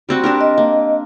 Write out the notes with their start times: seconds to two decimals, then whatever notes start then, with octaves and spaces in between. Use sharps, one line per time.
0.09 G3 C4 F#4
0.24 D4 G4 A#4
0.41 D#5
0.58 A#3